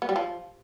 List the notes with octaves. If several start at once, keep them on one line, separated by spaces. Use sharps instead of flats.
B3
G3
F3